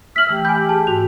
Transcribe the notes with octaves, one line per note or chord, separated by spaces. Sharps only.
E5 E6 F6 B6 F#7
E3 A3 G4
G#5 B5 G6
G#4 A5
G#2 F#4 F7